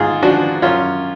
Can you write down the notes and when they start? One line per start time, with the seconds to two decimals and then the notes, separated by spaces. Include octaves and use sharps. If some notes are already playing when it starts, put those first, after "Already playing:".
Already playing: G#2 F4 G#4
0.23 F3 D4 F#4
0.62 F#2 C#4 F4